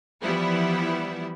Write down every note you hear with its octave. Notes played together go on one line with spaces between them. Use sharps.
E3 F3 G3 B3 E4